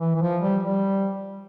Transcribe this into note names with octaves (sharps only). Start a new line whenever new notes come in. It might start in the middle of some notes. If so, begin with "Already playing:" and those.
E3
E3
F3
G3
G3